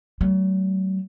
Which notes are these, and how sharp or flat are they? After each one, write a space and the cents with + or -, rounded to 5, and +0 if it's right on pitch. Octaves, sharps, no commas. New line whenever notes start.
F#3 +40 A3 +0